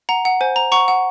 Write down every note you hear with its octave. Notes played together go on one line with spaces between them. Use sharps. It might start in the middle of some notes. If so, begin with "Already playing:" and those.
F#5 A#5
F#5
C5 G#5
C5 A#5
F#5 A#5 C#6
F#5